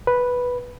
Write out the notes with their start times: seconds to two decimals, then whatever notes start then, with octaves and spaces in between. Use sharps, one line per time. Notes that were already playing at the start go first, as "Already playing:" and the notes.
0.07 B4